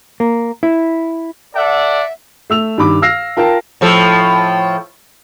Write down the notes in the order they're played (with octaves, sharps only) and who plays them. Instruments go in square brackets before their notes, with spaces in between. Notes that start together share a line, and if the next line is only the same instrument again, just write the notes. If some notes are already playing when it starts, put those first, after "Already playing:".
[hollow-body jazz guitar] A#3
E4
[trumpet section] A4 D5 F#5 [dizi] E5
[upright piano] A3 E6 F7
G2 D#3 B5 D6
F5 E6 F6 A#6 C7
F4 A#4 G5 A5
[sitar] A2 F3 A4